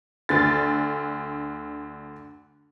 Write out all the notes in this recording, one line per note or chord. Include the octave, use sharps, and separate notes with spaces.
D2 D3 A6